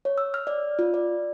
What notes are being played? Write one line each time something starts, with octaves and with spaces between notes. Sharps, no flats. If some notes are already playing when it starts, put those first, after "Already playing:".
C#5
E6
F6
D5
F4
D5